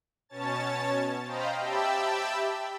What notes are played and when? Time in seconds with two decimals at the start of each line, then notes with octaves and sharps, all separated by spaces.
0.29 B2 C#4 C#5 A5 A6
1.25 C5 D#5 F5 G5 A#5 B5
1.60 G4 E5 G5 A5 B5 E6